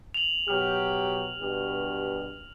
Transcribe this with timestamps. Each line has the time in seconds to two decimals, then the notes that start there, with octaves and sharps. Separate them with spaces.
0.14 F7 F#7
0.48 B2 F#3 G4 F6
1.40 G2 B2 G4